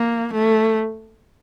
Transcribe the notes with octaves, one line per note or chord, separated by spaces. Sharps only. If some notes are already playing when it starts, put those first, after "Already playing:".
Already playing: A#3
A3